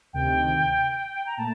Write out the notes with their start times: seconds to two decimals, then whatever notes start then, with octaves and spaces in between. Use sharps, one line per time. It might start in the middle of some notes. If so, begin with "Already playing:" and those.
0.13 D2 C3 D#3 G5
1.27 A#5
1.37 A#2 A3 A5